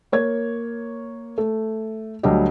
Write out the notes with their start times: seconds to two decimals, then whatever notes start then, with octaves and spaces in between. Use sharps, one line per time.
0.12 A#3 C#5 G#6
1.38 A3
2.23 D2 F#3 G3 D4 G4 D#5